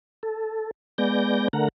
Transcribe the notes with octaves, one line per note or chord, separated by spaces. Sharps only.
A4
G#3 B3 D5 G6 A#6
D3 A3 A#4 F#5 A#5